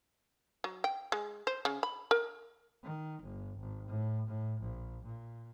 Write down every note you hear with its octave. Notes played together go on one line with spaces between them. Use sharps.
F#3
G5
G#3
C5
C#3
B5
A#4
D#3
G1
G#1
A2
A2
A#1
A#2